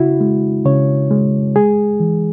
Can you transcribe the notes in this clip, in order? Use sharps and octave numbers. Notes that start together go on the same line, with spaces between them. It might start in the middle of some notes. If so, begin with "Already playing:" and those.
Already playing: C#3 E4 F#4
G#3
C#3 C#5
G#3
G#3 G#4
E3